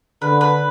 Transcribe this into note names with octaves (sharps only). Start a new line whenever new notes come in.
D3 B4
B4